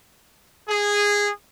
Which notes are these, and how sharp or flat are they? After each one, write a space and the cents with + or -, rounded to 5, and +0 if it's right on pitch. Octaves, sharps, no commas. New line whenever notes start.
G#4 -15